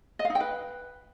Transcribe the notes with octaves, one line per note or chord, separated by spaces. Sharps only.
D#5
F5
D#4
G5
B4